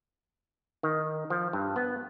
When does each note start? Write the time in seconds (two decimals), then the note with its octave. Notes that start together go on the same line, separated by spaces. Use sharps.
0.83 D#3
1.30 F3
1.53 G2
1.76 B3